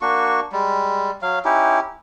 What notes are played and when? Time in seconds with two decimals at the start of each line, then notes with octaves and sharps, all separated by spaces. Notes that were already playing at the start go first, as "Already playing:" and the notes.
0.01 A#3 D4 F#4 C#6
0.52 G3 G#3
1.22 F#3 F5
1.45 C#4 D#4 E4 G4